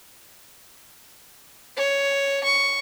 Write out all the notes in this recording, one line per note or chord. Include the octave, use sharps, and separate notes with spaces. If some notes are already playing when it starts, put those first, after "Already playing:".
C#5
C#6